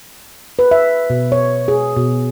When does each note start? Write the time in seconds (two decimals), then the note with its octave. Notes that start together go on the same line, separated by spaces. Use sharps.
0.59 B4
0.71 E5
1.10 B2
1.32 C#5
1.68 G#4
1.96 B2